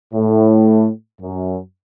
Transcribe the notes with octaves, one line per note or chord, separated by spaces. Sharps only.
A2
F#2